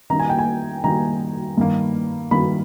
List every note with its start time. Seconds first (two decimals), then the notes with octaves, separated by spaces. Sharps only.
0.10 D#3 G3 A#3 D#4 A#5
0.20 G#5
0.29 G5
0.39 G#5
0.84 D#3 G3 A#3 D#4 A#5
1.57 G2 D#3 A#3
2.31 G2 D#3 A#3 B5